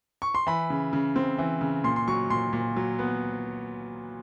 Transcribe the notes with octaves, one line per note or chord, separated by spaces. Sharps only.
C#6
C6
E3 B5
C#3
C#3
C4
E3
C#3
A#2 C6
C6
F#3 C#6
A#2 C6
A#2
F#3
B3